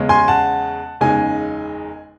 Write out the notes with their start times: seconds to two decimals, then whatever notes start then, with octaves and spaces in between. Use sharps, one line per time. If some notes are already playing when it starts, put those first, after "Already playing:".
Already playing: E2 C#3 G#3 C#4
0.09 G#5 C6
0.28 F#5 A5
1.01 F#1 E2 C#3 G#3 D#4 G#5